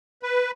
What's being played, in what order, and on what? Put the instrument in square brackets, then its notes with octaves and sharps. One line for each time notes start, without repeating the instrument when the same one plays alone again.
[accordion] B4